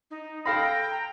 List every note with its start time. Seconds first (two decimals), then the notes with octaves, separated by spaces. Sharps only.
0.11 D#4
0.46 A4 F5 G5 B5 A#6
0.91 A#5